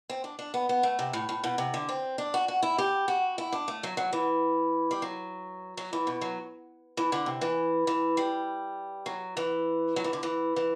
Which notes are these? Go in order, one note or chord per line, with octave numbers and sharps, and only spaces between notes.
C4
D4
D4
B3
B3
A3
C3
A2
A2
B2
C3
D3
C4
D4
F#4
F#4
E4
G4
F#4
E4
D4
A3
F#3
F#3
E3
G3
F#3
F#3
E3
B2
F#3
E3
D3
C3
E3
E3
G3
F#3
E3
F#3
E3
D3
E3
E3